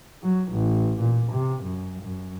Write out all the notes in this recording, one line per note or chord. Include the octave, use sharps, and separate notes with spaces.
F#3
A1
A#2
C3
F#2
F#2